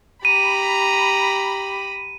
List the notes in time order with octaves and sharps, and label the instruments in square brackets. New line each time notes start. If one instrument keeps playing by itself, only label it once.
[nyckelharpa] G4 [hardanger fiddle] A#5 [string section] B5 [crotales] D#7